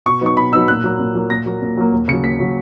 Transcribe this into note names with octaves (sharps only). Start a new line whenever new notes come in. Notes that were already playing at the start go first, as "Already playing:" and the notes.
B2 C#6
F#3 B3 D#4 C#6
B2 B5
F#3 B3 D#4 E6
A#2 F#6
F#3 A#3
A#2
F#3 A#3
A#2 A#6
F#3 A#3
A#2
F#3 A#3
D#2
C#3 F#3 C#7
D#2 B6
C#3 F#3